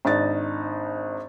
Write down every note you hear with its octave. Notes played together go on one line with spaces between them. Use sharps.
G#1 D4 D#4 A6